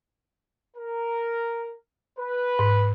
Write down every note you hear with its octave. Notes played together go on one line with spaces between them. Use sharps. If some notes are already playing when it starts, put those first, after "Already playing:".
A#4
B4
G#2